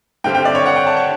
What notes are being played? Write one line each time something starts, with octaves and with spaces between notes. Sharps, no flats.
G2 D3 G3 C4 G5
G5
D5
C#5
F#5
G5
A5
C#6